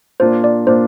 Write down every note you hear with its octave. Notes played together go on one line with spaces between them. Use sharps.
A#2 A#3 D4 F4 C5
D5
A#2 A#3 D4 F4 C5